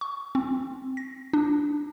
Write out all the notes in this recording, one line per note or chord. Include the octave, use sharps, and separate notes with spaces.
C#6
C4
A#6
D4